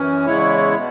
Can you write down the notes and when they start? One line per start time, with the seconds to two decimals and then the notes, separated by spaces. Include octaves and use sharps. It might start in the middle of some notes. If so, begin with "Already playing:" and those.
Already playing: F#2 E3 C#4
0.26 E2 C#3 G#3 E4 C#5
0.75 B2